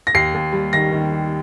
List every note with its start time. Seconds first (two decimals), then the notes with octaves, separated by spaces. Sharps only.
0.07 A#6
0.14 D#2 C7
0.34 D#2
0.53 G3
0.73 D#3 A#6
0.92 D#3
1.12 G3